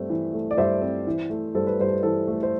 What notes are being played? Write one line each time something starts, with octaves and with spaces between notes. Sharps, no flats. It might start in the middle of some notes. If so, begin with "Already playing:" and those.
Already playing: G2 A3 C4
E3
A3
D5
G2 C5 E5
C4
E3
A3
G2 A4 C5
B4
G2 C5
B4
E3 A4 C5
A3
C5